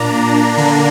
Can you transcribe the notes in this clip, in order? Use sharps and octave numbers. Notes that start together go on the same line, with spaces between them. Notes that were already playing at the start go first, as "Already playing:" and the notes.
Already playing: A#2 A#3 D4 A#5
D3 A#3 D4